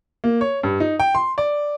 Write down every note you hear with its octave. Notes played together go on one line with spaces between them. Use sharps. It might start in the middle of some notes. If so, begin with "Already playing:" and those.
A#3
C#5
G2
D#4
G5
C6
D5